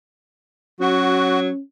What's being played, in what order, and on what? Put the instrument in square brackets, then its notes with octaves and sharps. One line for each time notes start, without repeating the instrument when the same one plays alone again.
[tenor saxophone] F#3 [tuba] C#4 [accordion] F#4